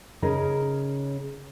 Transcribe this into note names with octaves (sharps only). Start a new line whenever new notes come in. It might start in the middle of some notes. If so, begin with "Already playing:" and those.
C#3 C#4 D#4 G#4 A#4